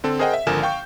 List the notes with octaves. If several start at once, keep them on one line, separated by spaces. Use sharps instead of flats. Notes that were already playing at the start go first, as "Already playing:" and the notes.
D3 C4 A4
G#4 A#4 C5 D#5 F#5 G5
E5
G#1 D3 F3 A#4 G#5 E7
F5 G5 C#6 G6